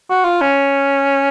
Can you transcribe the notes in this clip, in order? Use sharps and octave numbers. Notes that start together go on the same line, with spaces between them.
F#4
F4
C#4